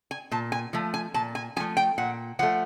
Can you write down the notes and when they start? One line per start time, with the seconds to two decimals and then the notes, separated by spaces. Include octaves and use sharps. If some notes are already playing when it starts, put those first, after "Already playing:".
0.11 G#5
0.32 A#2 A5
0.52 G#5
0.73 F3 A3
0.94 G#5
1.14 A#2 A5
1.35 G#5
1.56 F3 G#5
1.60 A3
1.77 G5
1.98 A#2 F#5
2.39 F3 A3 F#5